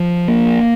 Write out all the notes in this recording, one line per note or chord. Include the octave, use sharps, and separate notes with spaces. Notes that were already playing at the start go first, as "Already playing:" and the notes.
Already playing: F3
A#3